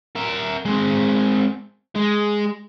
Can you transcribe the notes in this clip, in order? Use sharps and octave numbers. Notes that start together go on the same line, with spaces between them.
A#4 E5
G#3 C4
G#3